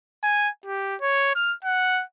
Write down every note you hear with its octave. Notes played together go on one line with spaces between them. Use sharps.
G#5
G4
C#5
F6
F#5